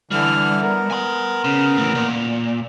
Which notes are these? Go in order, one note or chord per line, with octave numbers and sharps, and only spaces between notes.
D3 E3 G3 F6
B3 A#4
G#5 C6
C#3
A2 E3
A#2